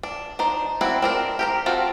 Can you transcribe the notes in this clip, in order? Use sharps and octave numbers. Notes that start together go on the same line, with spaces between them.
D4
D4 D#4 C5
C4 D4 E4 F#4
C4 D4 A#4
G4 A#4 C5
C4 F4 F#4 A4